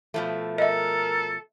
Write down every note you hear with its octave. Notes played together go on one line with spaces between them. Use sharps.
B2 F3 A3
A4 A#4 D#5 E5